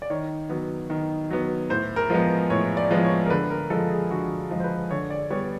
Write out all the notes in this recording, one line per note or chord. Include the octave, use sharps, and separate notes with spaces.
D5
D#3 C#5
F#3 B3
D#3
F#3 B3
A2 C5
A#4
F3 G#3 B3
A2 C#5
D5
F3 G#3 B3
C#5
A#4
D3 B4
A#4
F3 G#3 A4
G#4
D3 F#4
F3 G#3
C5
B4
D3 C#5
D5
G3 B3 C#5